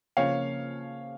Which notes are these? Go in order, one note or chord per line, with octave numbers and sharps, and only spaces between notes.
C#3 F3 A#3 C#4 C#5 F5